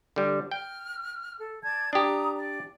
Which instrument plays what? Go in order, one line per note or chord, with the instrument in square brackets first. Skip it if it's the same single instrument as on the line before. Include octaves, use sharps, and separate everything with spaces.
[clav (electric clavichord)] D3 G3
[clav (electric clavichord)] G5 [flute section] F6
[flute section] A4
D5 A5 G#6
[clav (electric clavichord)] D4 G4 [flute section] A#5 D#6
[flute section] D5